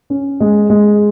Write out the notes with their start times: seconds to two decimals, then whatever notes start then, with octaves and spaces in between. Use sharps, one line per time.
0.10 C#4
0.40 G#3
0.70 G#3